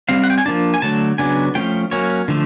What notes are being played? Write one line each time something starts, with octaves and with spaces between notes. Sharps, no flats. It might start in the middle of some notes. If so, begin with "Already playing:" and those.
G3 C4 F5
F#5
G5
G#5
F3 A#3 D4 A5
G#5
D3 F#3 A3 A5
C#3 F#3 B3 D4 G#5
F3 A3 C#4 G5
F#3 A#3 C#4 C#5
D3 F3 A3